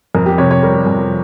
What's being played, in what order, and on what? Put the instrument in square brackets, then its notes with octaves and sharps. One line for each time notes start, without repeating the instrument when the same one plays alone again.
[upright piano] F2 A#4
G4
C3 C#5
C#5
G3 A#4
F2